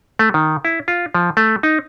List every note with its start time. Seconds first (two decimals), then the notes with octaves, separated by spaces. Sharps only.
0.19 A3
0.34 D#3
0.65 E4
0.88 F4
1.14 F3
1.37 A3
1.63 D#4